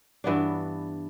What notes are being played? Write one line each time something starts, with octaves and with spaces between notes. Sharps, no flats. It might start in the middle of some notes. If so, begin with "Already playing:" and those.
G2 E3 B3 D4